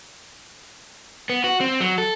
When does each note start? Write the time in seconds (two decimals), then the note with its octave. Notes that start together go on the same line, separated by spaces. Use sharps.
1.29 B3
1.44 F#4
1.61 C4
1.80 F#3
1.98 A4